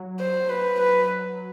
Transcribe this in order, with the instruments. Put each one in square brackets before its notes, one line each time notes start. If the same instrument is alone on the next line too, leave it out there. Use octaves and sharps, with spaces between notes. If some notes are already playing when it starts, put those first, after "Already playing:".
Already playing: [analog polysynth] F#3
[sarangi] C5
B4
B4